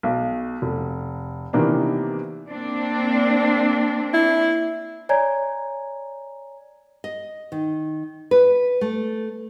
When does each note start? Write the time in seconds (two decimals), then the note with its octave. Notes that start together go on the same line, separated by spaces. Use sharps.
0.03 B1
0.62 F1
1.53 C3 D#3 E3 A#3 B3 D4
2.50 A#3 C4 D4
4.14 E4
5.09 C#5 D5 G#5 A#5 G#6
7.04 D#5
7.52 D#3
8.31 B4
8.81 A3